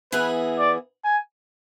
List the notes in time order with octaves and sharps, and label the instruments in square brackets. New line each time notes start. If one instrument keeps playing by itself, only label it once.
[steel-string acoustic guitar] E3 B3 E4 G#4 [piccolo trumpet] B4
[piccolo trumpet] D5
G#5